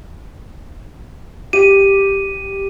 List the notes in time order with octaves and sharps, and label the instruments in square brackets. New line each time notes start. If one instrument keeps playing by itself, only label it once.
[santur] G4 [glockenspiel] D#7